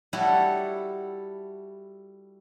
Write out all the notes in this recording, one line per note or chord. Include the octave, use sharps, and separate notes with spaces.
G3 E4 F#4 A4